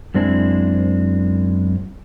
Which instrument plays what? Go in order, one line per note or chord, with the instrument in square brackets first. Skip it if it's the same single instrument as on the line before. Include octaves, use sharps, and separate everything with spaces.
[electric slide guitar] F#2 G#3 C4 D4 E4 G#5